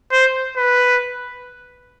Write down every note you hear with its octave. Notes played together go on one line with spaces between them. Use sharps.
C5
B4